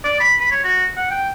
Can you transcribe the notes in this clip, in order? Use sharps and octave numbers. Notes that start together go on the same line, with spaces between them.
D5
B5
B5
C#5
F#4
F#5
G5